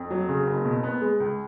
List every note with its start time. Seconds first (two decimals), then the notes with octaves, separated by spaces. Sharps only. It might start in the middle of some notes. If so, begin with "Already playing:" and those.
Already playing: F2
0.10 F#3
0.29 C#3
0.47 F#1
0.65 B2
0.83 B3
1.01 G#3
1.20 C#2